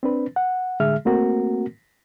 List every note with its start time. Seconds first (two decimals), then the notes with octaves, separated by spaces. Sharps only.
0.03 C4 D4 B4
0.36 F#5
0.80 A2 D3 G#3 G#4 E5 F6
1.05 A3 A#3 C4 F#4 A#4